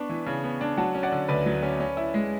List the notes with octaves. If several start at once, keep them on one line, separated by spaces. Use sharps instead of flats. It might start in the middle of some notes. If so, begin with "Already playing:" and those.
Already playing: B3 D4 C#6
E3
C#3
B3
D4
F#3 F#5 A5
C#4
D5 F#5
D3
D2 B4 D5
F#3
C#4
C#4
E4
G#3